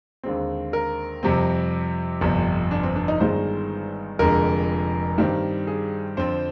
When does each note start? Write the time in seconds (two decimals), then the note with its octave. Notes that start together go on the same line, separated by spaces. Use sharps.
0.23 D#2 D3 G#3 C4
0.73 A#4
1.23 F2 C3 G3 C4
2.21 G1 F2 C3
2.71 D4
2.83 C4
2.96 D4
3.08 D#4
3.20 G1 G2 D#3 G#3 C5
4.19 F1 F2 D3 G#3 A#4
5.18 G2 D#3 G3 C4
5.67 G#4
6.17 F2 D3 F3 C4 C5